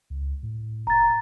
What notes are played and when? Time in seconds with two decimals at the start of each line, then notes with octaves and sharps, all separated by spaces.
0.10 C#2
0.43 A2
0.87 F1 A#5 A6